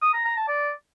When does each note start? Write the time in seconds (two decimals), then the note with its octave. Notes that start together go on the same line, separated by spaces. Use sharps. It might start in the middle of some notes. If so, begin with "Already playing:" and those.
0.02 D#6
0.13 A#5
0.25 A#5
0.36 A5
0.48 D5